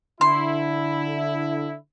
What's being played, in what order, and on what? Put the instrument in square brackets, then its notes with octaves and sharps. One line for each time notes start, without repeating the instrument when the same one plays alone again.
[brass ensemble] D3 E4 [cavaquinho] C6